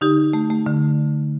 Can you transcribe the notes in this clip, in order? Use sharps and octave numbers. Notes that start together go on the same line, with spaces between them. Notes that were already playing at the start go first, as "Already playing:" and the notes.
D3 D#4 G4
D3
A3
A3
D3